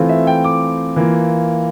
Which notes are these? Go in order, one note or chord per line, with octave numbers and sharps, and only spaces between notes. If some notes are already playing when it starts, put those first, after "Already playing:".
Already playing: E3 A3 C4 F4
E5
G5
D6
E3 A#3 F4